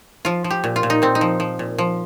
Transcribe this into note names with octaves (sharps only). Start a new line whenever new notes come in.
F3 F4
F3
G4
A#2
F4
A#2
D#4
A#2 C4
D#4
F3
F3
A#2
F3